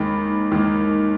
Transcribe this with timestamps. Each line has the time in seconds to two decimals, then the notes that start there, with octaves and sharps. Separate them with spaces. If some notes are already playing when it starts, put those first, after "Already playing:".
Already playing: D#2 D#3 G#3 B5
0.51 D#2 D#3 G#3